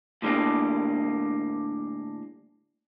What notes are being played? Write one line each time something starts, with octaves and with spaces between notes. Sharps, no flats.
A2 D3 G3 A#3 G#4